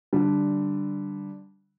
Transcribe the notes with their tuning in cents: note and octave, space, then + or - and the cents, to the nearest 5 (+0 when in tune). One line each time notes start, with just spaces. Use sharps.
D3 +0 G3 -10